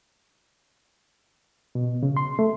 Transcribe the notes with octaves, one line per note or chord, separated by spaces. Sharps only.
B2
C#3
C6
A3